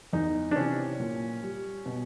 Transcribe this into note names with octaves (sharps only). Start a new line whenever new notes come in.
E2 D#4
D4
C3 E3 C#4
A#2
G3
B2